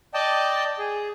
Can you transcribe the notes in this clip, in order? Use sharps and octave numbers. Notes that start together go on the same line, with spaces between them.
D5 D#5 G5 A5
G#4